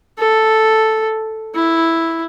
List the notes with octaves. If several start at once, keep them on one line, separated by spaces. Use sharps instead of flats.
A4
E4